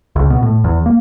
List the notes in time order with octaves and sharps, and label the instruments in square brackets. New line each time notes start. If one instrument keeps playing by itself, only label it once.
[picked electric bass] C#2
B2
A2
E2
A#3